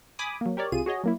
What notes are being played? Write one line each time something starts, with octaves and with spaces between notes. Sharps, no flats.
G#5 B5 D6 D#6
F#3 A#3
G4 A#4 C#5 D5
C2 C3 F4 G#4 D#7
F#4 G#4 C#5 D#5
F#3 A#3 E4